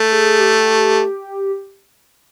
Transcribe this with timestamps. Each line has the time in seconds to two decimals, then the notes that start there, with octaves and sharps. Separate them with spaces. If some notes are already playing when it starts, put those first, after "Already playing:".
Already playing: A3
0.12 G#4
0.40 G4